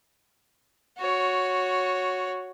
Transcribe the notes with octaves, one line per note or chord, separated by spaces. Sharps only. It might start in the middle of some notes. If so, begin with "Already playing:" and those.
F#4 C#5